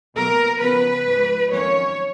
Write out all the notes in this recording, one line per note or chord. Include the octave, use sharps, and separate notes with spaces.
B2 F#3 A#3 A#4
C#3 F3 B3 B4
G#2 F3 G#3
F2 D#3 F#3 A#3 C#4 C#5